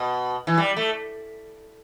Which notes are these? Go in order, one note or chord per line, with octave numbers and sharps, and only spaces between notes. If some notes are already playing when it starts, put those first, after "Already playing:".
Already playing: B2
E3
G3
A3